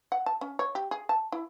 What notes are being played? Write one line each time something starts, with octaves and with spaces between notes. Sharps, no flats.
F#5
A5
C#4
C#5
G4
G#4
A5
E4